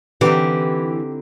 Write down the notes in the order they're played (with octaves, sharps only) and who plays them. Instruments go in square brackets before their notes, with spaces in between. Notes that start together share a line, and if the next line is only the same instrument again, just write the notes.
[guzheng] D3 C4 D#4 [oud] E3 [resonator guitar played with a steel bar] G4